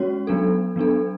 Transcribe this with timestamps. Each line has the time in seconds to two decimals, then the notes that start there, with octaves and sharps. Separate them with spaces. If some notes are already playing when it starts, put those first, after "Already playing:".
Already playing: G#3 C#4 F#4 C#5
0.27 F#3 B3 D4 A4
0.76 F#3 B3 D4 A4